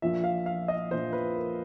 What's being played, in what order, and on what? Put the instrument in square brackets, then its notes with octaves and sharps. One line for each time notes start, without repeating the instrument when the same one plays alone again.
[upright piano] A#1 A#2 F3 E5
F5
F5
D#5
A#1 A#2 F3 C5
B4
A#4